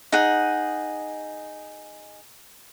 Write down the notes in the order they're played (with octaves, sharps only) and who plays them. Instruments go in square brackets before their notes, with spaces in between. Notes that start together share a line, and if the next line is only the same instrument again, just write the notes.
[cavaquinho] D#4 G#4 F#5